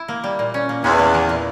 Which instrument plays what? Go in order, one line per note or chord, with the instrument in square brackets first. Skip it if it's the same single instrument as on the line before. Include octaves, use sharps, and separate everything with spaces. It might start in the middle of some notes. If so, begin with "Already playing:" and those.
Already playing: [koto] E4
A#3
G3
A#2
C#4
A#3
[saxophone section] E2 [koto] C#4
[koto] A#3
E3
A#2